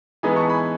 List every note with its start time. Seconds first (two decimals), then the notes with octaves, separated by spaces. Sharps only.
0.23 E3 G#3 B3 D#4 G#5 B5
0.36 A5 C#6
0.49 G#5 B5